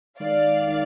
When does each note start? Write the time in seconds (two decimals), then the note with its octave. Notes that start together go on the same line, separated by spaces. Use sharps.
0.20 D#3 G#3 D#4 A#4 D5 F5
0.67 D#3 G#3 D#4 A#4